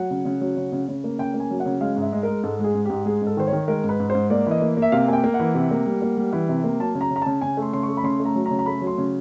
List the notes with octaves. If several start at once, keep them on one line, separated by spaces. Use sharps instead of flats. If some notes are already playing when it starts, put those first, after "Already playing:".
Already playing: F#3 F#5
C#3
C#3
F#3
C#3
C#3
C#3
A#3
C#3 G5
A#3
G#5
F#3
F#5
C#3
G#3 F5
G#2
E5
G#3
G#3 A#4
G#2 A4
G#3 G#4
G#2
G#2 G4
G#3 G#4
G#2 A4
D#3 C5
C#5
D#3
G#3 A#4
G#2
B4
G#2
C5
G#2
A#3 D5
E3 D#5
A#3
A#3
E5
C3 F5
A#3 G5 G#5
A#3
F#5
E3
C3
A#3
G3
A#3
G3
E3
C3
A#3
F#3 A5
C#3
A#5
C#3
A#5
C#3 A5
C#3 G#5
A3
C6
C#3 C6
C#6
A3
B5
C#3 C6
A3
A#5
F#3
A#5
C#3
A#5
A3 B5
F#3
C6
C#3